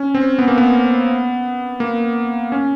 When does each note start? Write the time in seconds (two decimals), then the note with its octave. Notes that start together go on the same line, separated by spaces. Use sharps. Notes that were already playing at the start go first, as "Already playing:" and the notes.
Already playing: C#4
0.15 C4
0.39 B3
0.48 A#3
0.58 B3
1.80 A#3
2.52 C#4